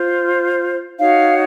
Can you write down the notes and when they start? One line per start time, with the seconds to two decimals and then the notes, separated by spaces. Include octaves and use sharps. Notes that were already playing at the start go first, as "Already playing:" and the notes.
Already playing: F4 C5
0.99 D#4 F#4 C#5 F5